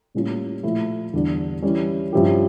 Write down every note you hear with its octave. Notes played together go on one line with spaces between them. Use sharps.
A2 G3 A#3 C#4 F4
A#2 F3 A3 E4
E2 D3 G3 D4
E3 G3 C#4
G2 F3 C#4 E4 G4